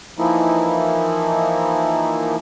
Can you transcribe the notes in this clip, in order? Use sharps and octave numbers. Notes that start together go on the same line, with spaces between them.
E3 F3 A#3 D#4 E4